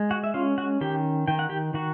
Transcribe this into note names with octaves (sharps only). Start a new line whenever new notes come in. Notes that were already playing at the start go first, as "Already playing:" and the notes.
Already playing: G#3
F#4 F#5
E5
C#4 F4 F5
F#4 F#5
D#3 G4 G5
D#3 G5
F#5
G4 G5
D#3 F#4 F#5